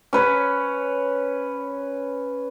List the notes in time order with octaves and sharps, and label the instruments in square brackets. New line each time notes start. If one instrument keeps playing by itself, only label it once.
[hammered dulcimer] C#4 B4 C#5